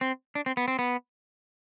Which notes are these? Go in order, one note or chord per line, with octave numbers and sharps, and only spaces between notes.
C4
D4
C4
B3
C4
B3